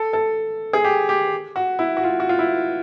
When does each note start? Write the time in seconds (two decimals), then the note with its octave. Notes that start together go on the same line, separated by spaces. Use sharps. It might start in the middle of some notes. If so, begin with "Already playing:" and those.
Already playing: A4
0.13 A4
0.73 G#4
0.84 G4
1.09 G4
1.56 F#4
1.79 E4
1.97 F#4
2.04 F4
2.20 F#4
2.29 F4
2.39 E4